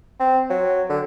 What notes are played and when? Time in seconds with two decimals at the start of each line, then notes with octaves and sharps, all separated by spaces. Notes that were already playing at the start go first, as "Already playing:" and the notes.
0.20 C4
0.50 F#3
0.89 D3